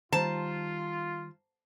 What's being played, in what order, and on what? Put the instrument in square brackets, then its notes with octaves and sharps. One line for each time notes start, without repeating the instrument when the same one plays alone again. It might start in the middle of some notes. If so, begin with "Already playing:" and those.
[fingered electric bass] D#3 G3 [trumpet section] F4 [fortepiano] C5 A#5 [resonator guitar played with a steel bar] A5